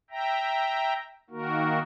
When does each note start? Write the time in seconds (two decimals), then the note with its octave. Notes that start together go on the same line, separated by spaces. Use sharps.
0.10 E5 G5 A#5
1.30 D#3 A#3 F#4 A#4